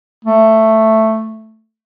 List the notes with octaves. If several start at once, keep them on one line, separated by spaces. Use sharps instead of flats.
A3